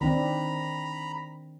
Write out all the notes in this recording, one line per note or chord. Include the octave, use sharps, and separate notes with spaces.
D#3 C4 D4 A#5 B5